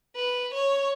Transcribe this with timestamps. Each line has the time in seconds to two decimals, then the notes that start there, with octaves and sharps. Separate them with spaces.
0.16 B4
0.54 C#5